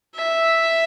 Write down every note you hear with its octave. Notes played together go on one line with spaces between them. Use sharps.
E5